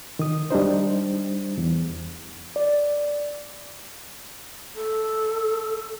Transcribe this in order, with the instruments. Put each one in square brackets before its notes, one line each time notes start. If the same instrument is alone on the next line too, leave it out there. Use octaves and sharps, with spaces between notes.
[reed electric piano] D#3 D#6
G3 D4 D#4 C5
E2
[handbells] D5
[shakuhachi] A4